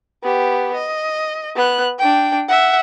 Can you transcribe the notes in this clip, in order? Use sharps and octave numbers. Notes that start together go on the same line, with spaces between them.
B3 G4
D#5
B3 F#6
D4 G5
E5 F#5